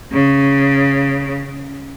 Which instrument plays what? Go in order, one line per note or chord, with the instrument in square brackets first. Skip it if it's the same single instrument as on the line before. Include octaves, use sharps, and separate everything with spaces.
[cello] C#3